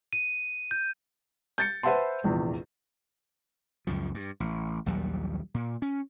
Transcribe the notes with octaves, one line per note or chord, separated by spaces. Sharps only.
D#7
G6
G6 A6 C#7
B4 C5 E5 F#5 A5 C6
F1 A#1 E2
C#2 F#2 F3
G2
A1
A#1 D#2 F#3 G3
A#2
C#4